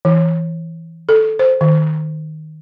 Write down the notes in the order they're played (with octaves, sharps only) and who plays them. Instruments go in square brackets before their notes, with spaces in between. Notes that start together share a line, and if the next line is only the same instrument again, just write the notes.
[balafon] E3
A4
C5
D#3